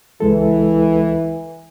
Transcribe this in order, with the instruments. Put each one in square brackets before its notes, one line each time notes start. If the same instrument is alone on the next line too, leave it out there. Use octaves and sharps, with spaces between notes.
[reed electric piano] C#2 G#3 A4 [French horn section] E3